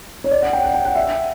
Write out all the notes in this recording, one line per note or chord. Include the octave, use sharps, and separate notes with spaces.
C#5
D5
F#5
G5
F#5
G5
F#5
E5